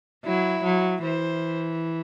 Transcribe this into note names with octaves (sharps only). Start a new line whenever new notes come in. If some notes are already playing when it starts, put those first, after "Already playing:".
F#3 E4
F#3
E3 C5